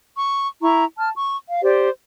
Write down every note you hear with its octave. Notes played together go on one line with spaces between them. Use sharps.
C#6
E4 A#5 C#6
A5 F6
C#6
F5
G4 C5 D5